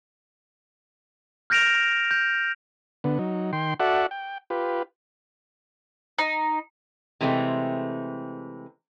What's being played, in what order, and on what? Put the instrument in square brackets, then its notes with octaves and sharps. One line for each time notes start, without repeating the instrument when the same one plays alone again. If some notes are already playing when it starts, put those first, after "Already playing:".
[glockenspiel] F6 G6 A#6 D7 E7 F7
G6
[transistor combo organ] D3 B3
F#3 D#4
D#3 G5 C6
F#4 A4 D5 E5 F#5
G5
F4 G4 B4
[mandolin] D#4
[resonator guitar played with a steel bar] C3 E3 G#3 A3 B3 C4